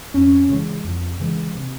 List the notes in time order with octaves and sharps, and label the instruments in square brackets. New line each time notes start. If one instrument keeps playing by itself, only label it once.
[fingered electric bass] F2 [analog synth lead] C#4
[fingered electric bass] C#3 E3 G#3
F2
C#3 E3 G#3
C3